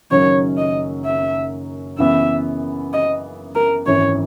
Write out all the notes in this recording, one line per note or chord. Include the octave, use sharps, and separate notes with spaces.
F#1 F#2 D#3 F#3 C#4 C#5
D#5
E5
F#2 C#3 E3 B3 E5
D#5
A#4
G#1 F#2 E3 C#5